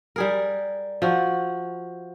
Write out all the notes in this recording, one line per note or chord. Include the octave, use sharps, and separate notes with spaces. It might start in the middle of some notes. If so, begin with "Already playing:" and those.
G3 G#4 A#4
F3 F#4